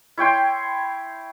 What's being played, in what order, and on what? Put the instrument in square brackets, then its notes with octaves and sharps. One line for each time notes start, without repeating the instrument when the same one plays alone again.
[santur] E4 C#5 G5 C6